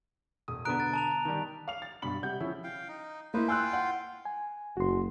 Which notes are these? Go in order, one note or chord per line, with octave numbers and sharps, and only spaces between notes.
E1 D#6
B2 D3 B3 A#5 F#6 D7
A6
A5 A#5 F7
D#3 G3
F5 F7
A6
G2 B2 B5 F#7
C3 G3 F#5 G6
C#3 F3 C#4 E4
F5 G5
D#4
A#3 D#4 E4 B4 C5
F4 F5 G5 G#5 E6 F#6
F#5
G#5
F#1 F#4 C6